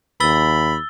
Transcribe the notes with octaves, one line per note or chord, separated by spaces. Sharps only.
D#2 B5 E6 A6 G7